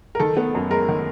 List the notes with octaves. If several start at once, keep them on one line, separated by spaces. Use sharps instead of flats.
A#4
D#3 A4
B3
F#2
G#3 A#4
D#3